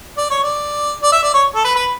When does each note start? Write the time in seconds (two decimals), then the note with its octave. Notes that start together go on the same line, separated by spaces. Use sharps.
0.18 D5
0.30 C#5
0.44 D5
1.03 D5
1.13 E5
1.23 D5
1.34 C#5
1.55 A4
1.65 B4
1.76 B4